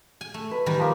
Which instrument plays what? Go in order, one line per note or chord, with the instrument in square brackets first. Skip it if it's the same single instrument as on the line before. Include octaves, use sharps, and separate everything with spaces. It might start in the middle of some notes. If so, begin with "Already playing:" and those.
[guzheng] G#5
A3
[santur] B4
[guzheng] D#3 E3 G3 [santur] B4
[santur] F3 A#3